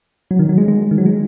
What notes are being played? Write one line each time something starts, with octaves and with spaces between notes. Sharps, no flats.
F#3
D#3
F#3
G#3
G#3
D#3
F#3
G#3